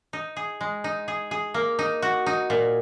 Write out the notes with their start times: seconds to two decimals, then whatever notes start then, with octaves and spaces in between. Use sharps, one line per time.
0.13 D#4
0.36 G#4
0.61 G#3
0.84 D#4
1.08 G#4
1.31 G#4
1.54 A#3
1.79 D#4
2.02 F#4
2.26 D#4
2.50 A#2